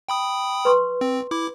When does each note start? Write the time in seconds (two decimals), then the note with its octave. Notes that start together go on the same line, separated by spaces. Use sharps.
0.09 G5 B5 D#6
0.65 B4 C6 C#6
1.01 C4
1.31 E4 D6